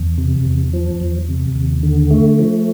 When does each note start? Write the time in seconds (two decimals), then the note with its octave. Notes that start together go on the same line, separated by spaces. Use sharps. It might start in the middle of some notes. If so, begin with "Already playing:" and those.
Already playing: E2
0.18 C3
0.45 E2
0.73 F3
1.00 E2
1.28 C3
1.55 D#2
1.83 D3
2.11 A3
2.39 F3